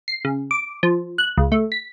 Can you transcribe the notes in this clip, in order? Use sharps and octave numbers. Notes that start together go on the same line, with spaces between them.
C7
C#3
D6
F3
F#6
C#2
A3
B6